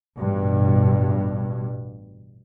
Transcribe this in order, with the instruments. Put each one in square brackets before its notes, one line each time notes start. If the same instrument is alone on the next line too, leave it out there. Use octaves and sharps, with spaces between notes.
[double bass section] A1 G2 B2